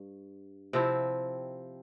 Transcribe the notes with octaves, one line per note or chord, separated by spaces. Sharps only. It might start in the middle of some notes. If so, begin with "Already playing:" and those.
Already playing: G2
C3 F3 C4 E4